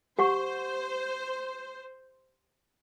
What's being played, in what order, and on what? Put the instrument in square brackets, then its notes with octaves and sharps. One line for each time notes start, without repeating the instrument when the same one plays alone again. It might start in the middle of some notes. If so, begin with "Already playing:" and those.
[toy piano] G4 F#5 C#6 [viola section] C5